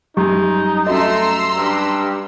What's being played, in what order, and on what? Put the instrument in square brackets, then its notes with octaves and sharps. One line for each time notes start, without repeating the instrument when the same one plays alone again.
[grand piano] F#2 G3 [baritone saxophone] D#4 [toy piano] G4
[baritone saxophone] A3 [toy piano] C#4 F#4 D#5 [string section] A#5 C6 E6
[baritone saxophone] G2